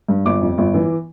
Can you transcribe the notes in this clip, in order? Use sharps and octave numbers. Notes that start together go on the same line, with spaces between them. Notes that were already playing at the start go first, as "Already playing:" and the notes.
G2
G1 D6
F2
G1
E3